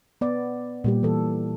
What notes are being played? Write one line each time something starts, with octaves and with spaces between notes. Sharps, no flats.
B3 D5
A#2 G3 G4
E3 A4